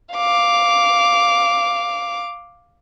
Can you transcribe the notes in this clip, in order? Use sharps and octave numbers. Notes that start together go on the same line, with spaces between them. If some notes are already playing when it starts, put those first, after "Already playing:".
F5 D6